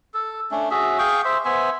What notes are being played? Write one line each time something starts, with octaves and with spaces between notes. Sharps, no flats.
A4
A3 C#4 D4
C#4 F#4 G#4 E5
G#4 F5 G5 C#6
C5 E5
B3 C5 E5 G#5